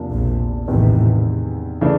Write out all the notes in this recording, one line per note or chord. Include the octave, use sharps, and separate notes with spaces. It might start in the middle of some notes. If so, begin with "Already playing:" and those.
Already playing: E2 C3 F3 A#3 D4
A#1 A#2
A1 E2 A2 C3 D#3
C#3 E3 A3 D4